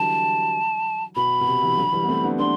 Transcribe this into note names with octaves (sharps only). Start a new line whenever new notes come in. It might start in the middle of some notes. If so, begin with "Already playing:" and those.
Already playing: D3 E3 F#3 G3 A5
B2 B5
B2
C3
C3 E3
D3 F#3
E3 G3
B3
A3 C4
B3 D4
B3 D4 C6